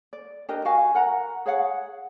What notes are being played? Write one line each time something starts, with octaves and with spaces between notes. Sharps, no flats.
D5
D4 G4 A#4 D#5
F#4 F5 G#5
A#4 F#5 A#5
G#4 C#5 F5 F#5